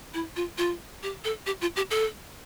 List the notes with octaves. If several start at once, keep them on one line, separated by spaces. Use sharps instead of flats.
E4
F4
F4
G4
A4
G4
F4
G4
A4